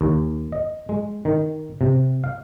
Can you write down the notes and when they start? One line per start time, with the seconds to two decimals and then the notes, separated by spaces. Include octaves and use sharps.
0.01 D#2
0.52 D#5
0.89 G#3
1.25 D#3
1.81 C3
2.24 F5